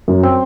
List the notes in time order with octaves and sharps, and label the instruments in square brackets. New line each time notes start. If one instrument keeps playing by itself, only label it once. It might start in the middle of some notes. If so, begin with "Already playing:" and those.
[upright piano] F#2
[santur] C4